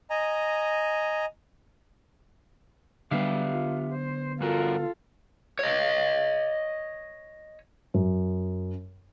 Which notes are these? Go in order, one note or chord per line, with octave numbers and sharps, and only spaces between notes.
D#5 G#5 A#5
D3 F#3 G3 B3 G4 E5 F5
F4
C5
G2 F4 F#4 A4 A#4
C#5 D#5
F#2